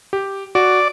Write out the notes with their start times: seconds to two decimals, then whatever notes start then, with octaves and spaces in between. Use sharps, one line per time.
0.13 G4
0.55 F#4 D5